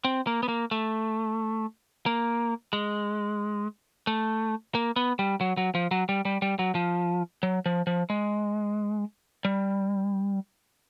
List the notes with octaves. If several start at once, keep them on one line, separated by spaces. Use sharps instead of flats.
C4
A#3
B3
A#3
A3
A#3
G#3
A3
A#3
B3
G3
F#3
F#3
F3
F#3
G3
G3
G3
F#3
F3
F#3
F3
F3
G#3
G3